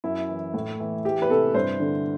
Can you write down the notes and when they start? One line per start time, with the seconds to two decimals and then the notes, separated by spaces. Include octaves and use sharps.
0.04 F#2 E4
0.29 E3
0.54 A2
0.80 E3
1.05 E3 G4
1.22 B4
1.30 C3 A4
1.54 G2 C5
1.80 D3